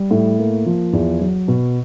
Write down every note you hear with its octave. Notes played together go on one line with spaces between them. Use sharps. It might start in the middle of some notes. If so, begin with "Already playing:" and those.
Already playing: G3
A2
A#3
F3
E2
F#3
B2